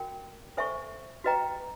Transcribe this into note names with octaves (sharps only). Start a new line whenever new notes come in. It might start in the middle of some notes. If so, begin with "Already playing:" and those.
Already playing: F#4 A#4 G5
A4 C5 E5 G#5 C#6
F#4 B4 D#5 G5 A#5